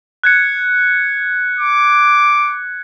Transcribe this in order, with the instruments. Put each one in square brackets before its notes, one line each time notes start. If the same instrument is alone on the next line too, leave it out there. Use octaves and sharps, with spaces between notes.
[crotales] F#6 G#6 C#7
[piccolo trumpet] D6